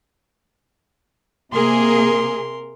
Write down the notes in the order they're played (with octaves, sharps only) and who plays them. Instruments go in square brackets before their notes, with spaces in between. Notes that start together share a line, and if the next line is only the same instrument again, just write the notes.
[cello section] C3 A#3 G#4 [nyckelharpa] A#4 C6